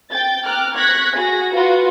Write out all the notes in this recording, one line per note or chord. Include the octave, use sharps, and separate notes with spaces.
G5 G6 A6
G5 A#5 D6 F6 F#6
C#6 F#6 G#6 A#6 B6
F#4 G#4 A#6
F4 F#4 B4 C6